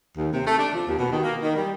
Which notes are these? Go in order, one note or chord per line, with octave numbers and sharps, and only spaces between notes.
D#2
C3
A3
D4
F3
D#2
B2
D#3
A#3
D#3
G3